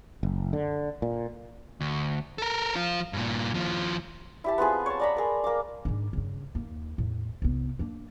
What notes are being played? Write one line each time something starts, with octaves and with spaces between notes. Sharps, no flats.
F#1
D3
A#2
D2
A4 A#4
F3 F4
G2 A#2
D#2 F3
E4 G4 A5
B3 C4 F4 G#4
C#5 A5
D5 A#5 B5
G#4 A#4
A#3 D6
G#2 D4
G2 C#3
D#2 A#3
E2 A2
C2 B3
A#3 D4